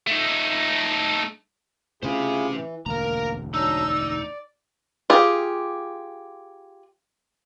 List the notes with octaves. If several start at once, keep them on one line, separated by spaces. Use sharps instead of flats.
A3 D#4
A2 C#3 E4 F4 G4 G#4 C5
E3
E1 A1 D2 A#3 A#4 A#5
F#3 D4 D#4 A#5 E6
D5
F4 G4 G#4